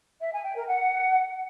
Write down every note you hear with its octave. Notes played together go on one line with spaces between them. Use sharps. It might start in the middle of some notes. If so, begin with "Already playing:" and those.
E5
G#5
G5
A#4
F#5